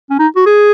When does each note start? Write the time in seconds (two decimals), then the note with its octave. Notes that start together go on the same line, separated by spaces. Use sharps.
0.10 C#4
0.19 D#4
0.36 F#4
0.46 G#4